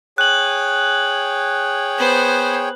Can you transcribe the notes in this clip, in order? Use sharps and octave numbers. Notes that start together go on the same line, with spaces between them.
G#4 C#5 G5 F#6 F#7
B3 C5